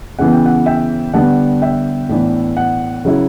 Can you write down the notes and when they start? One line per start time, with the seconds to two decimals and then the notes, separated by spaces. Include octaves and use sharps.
0.19 C#3 E3 B3 F#5
0.33 G5
0.46 F#5
0.66 E5 G5
1.14 D3 G3 B3 D4 F#5 A5
1.62 E5 G5
2.09 A2 E3 B3 D4
2.57 F#5
3.05 C#3 F#3 C#4 E4